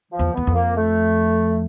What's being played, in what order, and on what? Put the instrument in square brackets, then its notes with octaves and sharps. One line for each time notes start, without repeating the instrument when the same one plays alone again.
[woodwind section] F3
[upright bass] E2
[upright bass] E2 [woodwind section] B3
[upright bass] F2
[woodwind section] A#3
A3